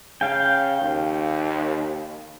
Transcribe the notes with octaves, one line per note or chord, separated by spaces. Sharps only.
C#3 F5 G5
D#2